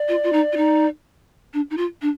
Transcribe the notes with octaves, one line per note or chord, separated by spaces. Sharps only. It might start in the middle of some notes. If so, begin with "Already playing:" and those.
Already playing: D5
F4
F4
D#4
F4
D#4
D4
D#4
F4
D4